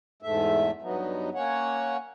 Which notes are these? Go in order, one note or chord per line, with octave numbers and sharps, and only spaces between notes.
E2 G#2 A3 E5
G2 F#3 B3 D#4
A#3 C#4 C#5 F#5